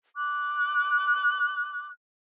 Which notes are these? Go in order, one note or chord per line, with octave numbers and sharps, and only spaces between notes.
D6 F#6